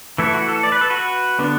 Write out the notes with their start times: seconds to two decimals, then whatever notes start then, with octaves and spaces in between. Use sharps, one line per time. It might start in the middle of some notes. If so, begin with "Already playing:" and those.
0.18 E3 A3 E4 A4
0.34 F#4
0.49 A4
0.63 D5
0.72 B4
0.81 A4
0.90 F#4 B4
1.39 D3 B3 D4